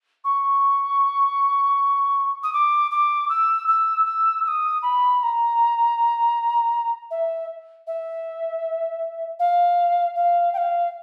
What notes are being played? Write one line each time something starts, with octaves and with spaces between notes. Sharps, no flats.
C#6
D#6
D6
D6
E6
E6
E6
E6
D#6
B5
B5
A#5
E5
E5
F5
F5
G5
F5